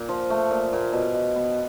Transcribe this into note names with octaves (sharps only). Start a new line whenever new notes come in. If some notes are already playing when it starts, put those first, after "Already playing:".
Already playing: A#2
F3
A3
A#2
A#2
B2
B2
B3